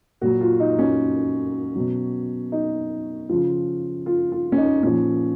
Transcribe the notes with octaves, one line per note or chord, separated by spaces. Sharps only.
A#2 F#3 F#4
F4
D#4
C#4
B2 F#3
D#4
C#3 F3 F4
F4
F4
C#4
D#4
A#2 F3 C#4